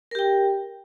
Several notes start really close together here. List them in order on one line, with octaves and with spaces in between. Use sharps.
A#4 G4 G5